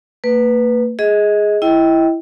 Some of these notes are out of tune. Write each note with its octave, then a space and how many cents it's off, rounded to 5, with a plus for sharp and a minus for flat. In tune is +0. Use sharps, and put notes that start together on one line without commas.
A#3 -40 B4 +0
G#4 +0 D#5 +25
E4 +5 D#5 +35 G5 +0